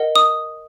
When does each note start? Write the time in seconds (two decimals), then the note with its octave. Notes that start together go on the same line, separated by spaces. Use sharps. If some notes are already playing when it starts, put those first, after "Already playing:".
Already playing: A#4 D#5 F#5
0.16 D#6